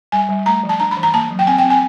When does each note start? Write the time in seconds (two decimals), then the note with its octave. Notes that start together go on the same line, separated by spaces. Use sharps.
0.12 G3 G#5
0.29 G3
0.46 A3 A#5
0.63 F3
0.69 A5
0.80 D4 A#5
0.91 B5
0.97 E3
1.03 A#5
1.14 A#3 A5
1.31 F#3
1.39 G5
1.47 C4 G#5
1.58 G5
1.65 C4
1.70 G#5